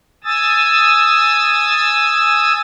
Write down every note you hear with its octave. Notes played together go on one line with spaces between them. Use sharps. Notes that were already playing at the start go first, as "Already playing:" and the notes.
G#5 D#6 E6 A6